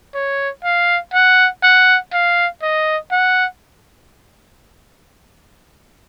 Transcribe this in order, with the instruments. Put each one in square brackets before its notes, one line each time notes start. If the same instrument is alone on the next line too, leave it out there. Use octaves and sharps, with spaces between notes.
[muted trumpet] C#5
F5
F#5
F#5
F5
D#5
F#5